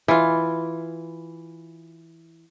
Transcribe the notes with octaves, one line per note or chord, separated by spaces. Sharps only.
E3 F4